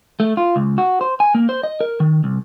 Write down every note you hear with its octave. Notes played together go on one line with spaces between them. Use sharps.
A3
F4
C#2
F#4
C5
G#5
A#3
C5
D#5
A#4
D#3
C2